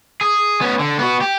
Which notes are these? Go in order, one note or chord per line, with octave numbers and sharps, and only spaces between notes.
G#4
B3 C#4
D3
B3 F#4
G4